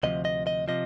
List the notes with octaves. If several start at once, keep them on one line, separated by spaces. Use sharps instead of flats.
D2 C3 F3 D#5
D#5
D#5
C3 F3 D#5